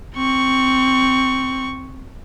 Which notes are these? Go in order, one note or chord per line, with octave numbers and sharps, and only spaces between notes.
C4 C#6